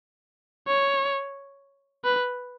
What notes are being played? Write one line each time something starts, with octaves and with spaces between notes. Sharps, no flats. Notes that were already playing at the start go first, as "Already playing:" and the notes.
C#5
B4